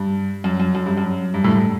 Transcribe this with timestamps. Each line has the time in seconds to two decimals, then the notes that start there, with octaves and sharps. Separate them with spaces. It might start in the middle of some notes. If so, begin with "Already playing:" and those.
Already playing: G2
0.44 F#2
0.60 F#2
0.75 F#2
0.86 G2
0.98 F#2
1.34 G2
1.44 A2
1.49 G2